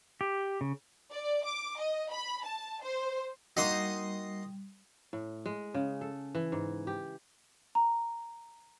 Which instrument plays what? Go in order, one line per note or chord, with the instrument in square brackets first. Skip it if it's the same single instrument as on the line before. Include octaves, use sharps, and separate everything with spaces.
[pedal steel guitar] G4
C#3
[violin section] D5
D6
D#5
B5
A5
C5
[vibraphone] G3 [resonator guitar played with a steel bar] A#3 D#4 F#4 [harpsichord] D#5 C6 D#6
[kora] A2
G#3
C#3
A4
E3
G#2
G4
[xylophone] A#5